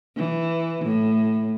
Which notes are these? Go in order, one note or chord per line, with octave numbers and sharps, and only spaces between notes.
E3
A2